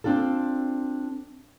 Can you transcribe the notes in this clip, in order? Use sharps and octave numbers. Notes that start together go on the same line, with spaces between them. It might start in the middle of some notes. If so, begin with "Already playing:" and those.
C4 D4 F4 A4